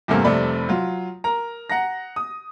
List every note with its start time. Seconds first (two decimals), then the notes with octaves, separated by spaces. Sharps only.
0.08 E2 G2 C3 A3 A#3 C4
0.24 F1 C3 G3 A3 D5 B5
0.69 F#3 F4
1.24 A#4 A#5
1.70 F#5 A#5 A#6
2.16 D#6